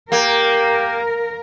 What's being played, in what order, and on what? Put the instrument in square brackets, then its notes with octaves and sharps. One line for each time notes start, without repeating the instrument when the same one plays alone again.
[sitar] A#3 [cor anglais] G4 [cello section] A#4